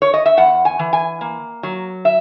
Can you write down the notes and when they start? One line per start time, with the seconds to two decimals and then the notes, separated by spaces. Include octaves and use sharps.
0.02 C#5
0.14 D#5
0.26 E5
0.37 E2 F#5
0.65 G#5
0.79 E3
0.93 G#5
1.21 A#3
1.63 F#3
2.05 E5